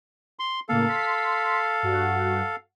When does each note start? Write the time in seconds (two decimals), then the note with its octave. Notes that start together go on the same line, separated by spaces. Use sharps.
0.39 C6
0.69 A2 C#3 A#3 A4 F5
0.88 C6 B6 C7
1.83 G2 F#4 F#5